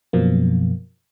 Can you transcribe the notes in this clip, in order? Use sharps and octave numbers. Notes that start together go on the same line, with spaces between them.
F#2 B2 F3 A#3